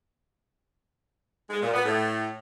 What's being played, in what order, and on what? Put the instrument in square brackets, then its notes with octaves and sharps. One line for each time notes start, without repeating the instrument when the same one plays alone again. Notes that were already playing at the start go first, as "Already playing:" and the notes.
[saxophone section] G#3
A#2
B3
A2